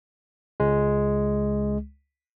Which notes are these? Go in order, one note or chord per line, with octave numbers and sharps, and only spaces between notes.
C#2 G#3